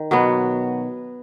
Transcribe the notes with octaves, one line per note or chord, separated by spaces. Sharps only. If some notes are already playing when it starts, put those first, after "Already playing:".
Already playing: D#3
B2 F#3 B3